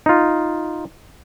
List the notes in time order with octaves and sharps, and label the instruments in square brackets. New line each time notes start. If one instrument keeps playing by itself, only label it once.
[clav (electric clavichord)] D#4 F4